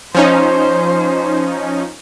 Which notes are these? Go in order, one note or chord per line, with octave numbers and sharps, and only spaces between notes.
F3 C#4 D#4 C5